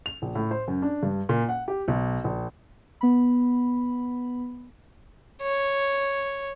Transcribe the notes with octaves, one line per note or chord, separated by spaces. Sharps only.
F7
A#1
A2
C5
F#2
D4
G2
A#2
F#5
G4
B1
A#1
B3 B5
C#5